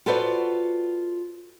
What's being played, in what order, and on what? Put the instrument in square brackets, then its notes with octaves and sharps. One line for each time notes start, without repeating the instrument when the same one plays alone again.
[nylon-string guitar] F4 F#4 A4 B4 C5 D5